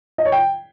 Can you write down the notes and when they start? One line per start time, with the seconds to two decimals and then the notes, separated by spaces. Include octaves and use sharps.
0.18 D#5
0.25 C#5
0.32 G5